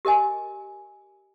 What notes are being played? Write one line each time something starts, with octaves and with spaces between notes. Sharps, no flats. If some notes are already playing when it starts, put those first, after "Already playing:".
G4 A#4 D#5 G#5